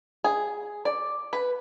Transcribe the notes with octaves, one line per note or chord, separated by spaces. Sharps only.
G#4
D5
B4